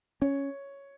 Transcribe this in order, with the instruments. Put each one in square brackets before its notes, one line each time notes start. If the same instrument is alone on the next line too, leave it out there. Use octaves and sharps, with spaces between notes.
[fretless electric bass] C#4 [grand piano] C#5